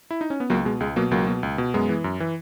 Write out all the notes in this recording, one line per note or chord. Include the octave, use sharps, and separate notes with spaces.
E4
D#4
C#4
B3
C#2 F#3 A#3
B2 G#3
C#2 G#3
B2 F#3 A#3
C#2 F#3 A#3
B2
C#2
B2
F#2 G#3 B3
E3
F#2
E3